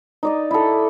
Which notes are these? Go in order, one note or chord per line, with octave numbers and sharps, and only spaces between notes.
D#4 D5 D#5
E4 A4